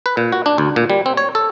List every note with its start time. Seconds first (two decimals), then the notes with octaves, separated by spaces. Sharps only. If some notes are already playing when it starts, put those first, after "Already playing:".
0.06 B4
0.17 A#2
0.32 F#4
0.46 D4
0.58 D2
0.76 A#2
0.90 G3
1.06 C4
1.17 C#5
1.35 A4